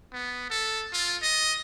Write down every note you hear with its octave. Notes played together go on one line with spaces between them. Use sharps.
B3
A4
F4
D#5